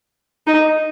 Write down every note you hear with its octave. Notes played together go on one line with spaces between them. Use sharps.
D#4